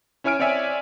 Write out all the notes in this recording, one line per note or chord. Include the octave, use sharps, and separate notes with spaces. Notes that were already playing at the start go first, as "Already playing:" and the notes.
C#4 E4 C#5 G#5 F6 D7
C4 C#5 D5 E5 G#5